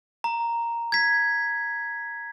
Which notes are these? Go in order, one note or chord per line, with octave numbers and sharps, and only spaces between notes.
A#5
G#6 B6